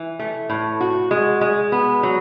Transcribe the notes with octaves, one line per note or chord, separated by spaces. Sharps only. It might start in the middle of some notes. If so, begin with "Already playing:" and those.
Already playing: E3
A3
A2
F#4
G#3
G#3
B3
F#3